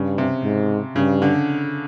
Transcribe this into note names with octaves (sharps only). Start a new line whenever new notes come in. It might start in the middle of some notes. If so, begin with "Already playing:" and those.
Already playing: G2 C#3
C3
G#2
G2 C#3
D3